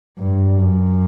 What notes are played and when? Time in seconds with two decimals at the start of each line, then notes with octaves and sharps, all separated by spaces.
0.19 G2
0.57 F#2